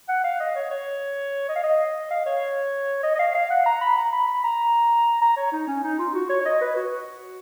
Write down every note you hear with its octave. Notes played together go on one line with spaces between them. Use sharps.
F#5
F5
D#5
C#5
C#5
D#5
F5
D#5
F5
C#5
D#5
D#5
F5
F5
F#5
A#5
B5
A#5
B5
B5
A#5
A#5
C#5
D#4
C#4
D#4
F4
F#4
C#5
C#5
D#5
B4
F#4